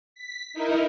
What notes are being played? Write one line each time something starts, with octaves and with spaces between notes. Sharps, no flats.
B6
D#4 E4 A#4